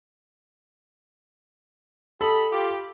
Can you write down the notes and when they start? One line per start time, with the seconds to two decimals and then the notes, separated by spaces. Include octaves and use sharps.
2.21 G4 A4 D#5 B5
2.52 F4 G4